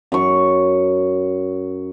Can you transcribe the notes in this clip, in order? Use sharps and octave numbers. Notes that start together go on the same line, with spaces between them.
F#2 C#6